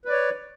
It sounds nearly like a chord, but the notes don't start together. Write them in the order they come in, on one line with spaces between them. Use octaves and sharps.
B4 D5 C#5